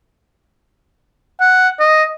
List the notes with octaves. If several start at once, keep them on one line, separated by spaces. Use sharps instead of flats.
F#5
D#5